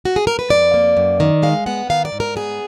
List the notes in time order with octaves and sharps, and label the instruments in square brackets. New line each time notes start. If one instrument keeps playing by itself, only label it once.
[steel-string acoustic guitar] F#4
G#4
A#4
B4
F2 D5
A#3
F#2
D#3
G#3 F5
B3 F#5
D#3 F5
D5
G#2
A#4
B3 G#4